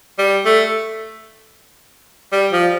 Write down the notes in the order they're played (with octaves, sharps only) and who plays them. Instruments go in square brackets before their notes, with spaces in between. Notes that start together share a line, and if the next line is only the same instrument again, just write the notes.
[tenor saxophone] G3
A3
G3
F3